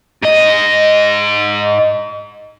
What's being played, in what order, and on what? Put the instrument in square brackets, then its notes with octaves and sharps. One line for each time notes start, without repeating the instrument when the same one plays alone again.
[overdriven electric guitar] G#2 D#5